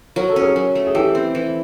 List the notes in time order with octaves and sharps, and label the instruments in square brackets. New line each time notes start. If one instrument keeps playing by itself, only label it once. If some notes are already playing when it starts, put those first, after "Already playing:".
[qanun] F#3 [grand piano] A#4
[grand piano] A4
[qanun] C#4
[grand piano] G#4 A#4
[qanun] F#3
A3
[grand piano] G#4
[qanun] E3 [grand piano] G4 A4
[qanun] C4
E3